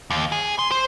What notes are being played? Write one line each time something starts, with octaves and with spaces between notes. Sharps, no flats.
D#2
G#4
C6
C5